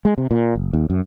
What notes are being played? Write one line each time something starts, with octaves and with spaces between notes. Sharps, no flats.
G#3
C3
A#2
F#1
D#2
F#2